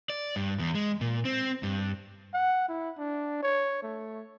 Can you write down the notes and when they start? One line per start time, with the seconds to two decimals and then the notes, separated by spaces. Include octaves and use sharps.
0.10 D5
0.36 G2
0.59 E2
0.75 G#3
1.01 A#2
1.25 C4
1.63 G2
2.34 F#5
2.69 E4
2.98 D4
3.43 C#5
3.83 A3